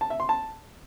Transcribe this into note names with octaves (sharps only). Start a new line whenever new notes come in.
A5
E5
C6
A5